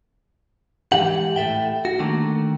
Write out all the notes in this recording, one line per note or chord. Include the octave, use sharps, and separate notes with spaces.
G#2 E3 G4 F#5
A2 A4 E5 G5
F#4
D3 D#3 A3 A#3